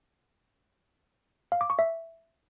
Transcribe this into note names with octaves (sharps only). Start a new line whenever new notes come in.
F5
D6
C#6
E5